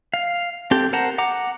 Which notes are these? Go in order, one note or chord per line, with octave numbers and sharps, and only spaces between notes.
F5
C4 G4 A4 G5
A#4 C5 F#5 A5 A#5
F#5 A#5 D6